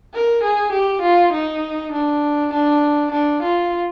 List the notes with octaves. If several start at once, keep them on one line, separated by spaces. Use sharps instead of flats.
A#4
G#4
G4
F4
D#4
D4
D4
D4
F4